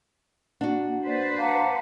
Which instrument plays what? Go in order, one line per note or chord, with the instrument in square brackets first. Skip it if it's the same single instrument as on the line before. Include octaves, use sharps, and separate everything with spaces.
[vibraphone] A#3 F#5 [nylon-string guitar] D4 F#4
[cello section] B4 C5 [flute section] D5
[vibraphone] F5 A#5 [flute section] F#5 A5 D6